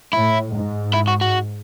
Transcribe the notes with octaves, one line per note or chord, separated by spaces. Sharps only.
A2 E4
G#2
E4
F#4
F#4